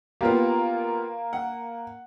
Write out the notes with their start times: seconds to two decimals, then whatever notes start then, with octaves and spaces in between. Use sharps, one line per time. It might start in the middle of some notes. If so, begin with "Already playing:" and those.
0.21 A#3 B3 F4 G4
1.33 F#5